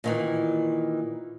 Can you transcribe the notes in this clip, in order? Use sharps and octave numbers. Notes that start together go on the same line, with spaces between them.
A#2 D#3 E3